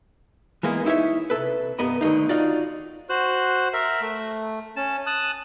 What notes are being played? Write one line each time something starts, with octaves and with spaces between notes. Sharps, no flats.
E3 G#3 A#3 B3
D#4 E4 G4 C#5 E5
C3 A4 B4
C2 G2 B3 A#4 D#5 B5
D3 D#3 A3 A#3 D#4
D#4 F4 F#4 D5
F#4 C5 F#6
A#4 E5
A3
C#4 A5
A5 D#6 F#6